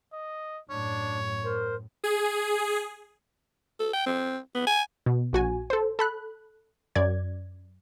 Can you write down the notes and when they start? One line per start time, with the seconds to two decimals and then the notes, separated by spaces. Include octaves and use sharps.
0.13 D#5
0.70 F#2 A2 D4 C#5
1.44 A#4 C5
2.04 G#4
3.80 A4
3.93 G5
4.06 C4
4.55 B3
4.67 G#5
5.06 B2
5.33 A#1 F#4 G#5
5.70 A4 C5
5.99 A4 B5 F#6
6.95 F#2 D5 G#6